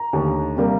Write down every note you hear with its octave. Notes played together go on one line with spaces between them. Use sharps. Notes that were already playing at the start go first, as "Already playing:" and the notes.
Already playing: A#5
D#2 D3 A3
C3 G3 A#3